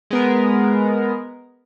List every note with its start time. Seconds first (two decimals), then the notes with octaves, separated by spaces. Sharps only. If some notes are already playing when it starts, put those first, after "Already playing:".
0.10 G#3 B3 A#4